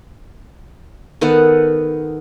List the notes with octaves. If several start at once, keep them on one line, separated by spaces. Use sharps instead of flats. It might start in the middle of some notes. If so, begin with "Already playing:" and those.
D#3 B3 A4 F#5